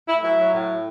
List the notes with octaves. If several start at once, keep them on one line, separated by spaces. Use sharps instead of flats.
A2 E4
F#3 E4
F#3
A2